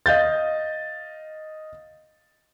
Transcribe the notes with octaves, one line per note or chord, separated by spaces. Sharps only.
D#5 F5 G6 A6